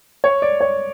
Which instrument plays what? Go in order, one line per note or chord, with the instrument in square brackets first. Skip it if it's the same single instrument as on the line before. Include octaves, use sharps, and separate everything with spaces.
[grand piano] C#5
D5
C#5